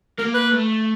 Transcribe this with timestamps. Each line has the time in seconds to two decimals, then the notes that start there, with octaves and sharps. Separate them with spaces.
0.19 A#3 A#4
0.34 B4
0.51 A3